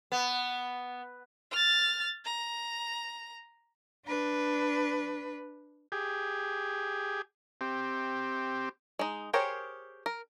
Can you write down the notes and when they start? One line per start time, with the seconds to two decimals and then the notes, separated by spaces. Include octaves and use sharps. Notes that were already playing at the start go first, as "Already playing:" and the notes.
0.12 B3
1.51 F6 A6
2.25 A#5
4.05 D4 B4
5.92 G4 G#4
7.61 C4 G4
8.99 G#3 D#4
9.33 G4 G#4 A#4 C5 C#5
10.06 A#4